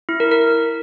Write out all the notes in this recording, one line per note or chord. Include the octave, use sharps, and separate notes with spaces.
E4
A#4
A#4